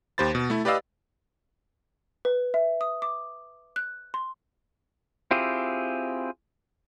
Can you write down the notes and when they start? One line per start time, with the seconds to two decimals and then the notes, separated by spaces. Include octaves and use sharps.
0.18 D#2 G4 C5 B5 A6
0.35 B2
0.50 A3 E4
0.65 G4 B4 D5 D#5 F5 E6
2.25 B4
2.54 E5
2.81 D#6
3.02 D6
3.76 F#6
4.14 C6
5.31 C4 E4 F4 G4 G#4